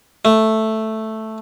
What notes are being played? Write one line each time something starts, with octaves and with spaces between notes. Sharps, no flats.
A3